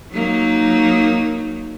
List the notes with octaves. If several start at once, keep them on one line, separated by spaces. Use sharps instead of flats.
F#3 A#3 D#4